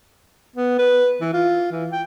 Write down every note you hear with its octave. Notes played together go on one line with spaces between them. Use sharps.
B3
B4
E3
F4
E3
G5